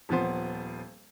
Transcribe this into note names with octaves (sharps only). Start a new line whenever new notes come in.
D#1 F3 B3 C5